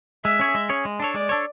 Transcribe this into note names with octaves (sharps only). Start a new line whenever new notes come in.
G#3 E5
C#4 G#4 C#5
G#3
C#4 G#4 C#5
G#3
D4 A4 C#5
G#3 D5
D4 A4 C#5